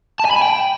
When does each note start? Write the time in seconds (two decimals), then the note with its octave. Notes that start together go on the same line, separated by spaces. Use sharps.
0.20 A5
0.25 G#5
0.31 B5
0.36 G#5
0.42 G5